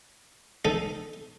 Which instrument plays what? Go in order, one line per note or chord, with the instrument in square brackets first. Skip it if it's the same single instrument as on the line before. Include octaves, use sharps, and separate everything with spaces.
[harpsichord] D#4 A4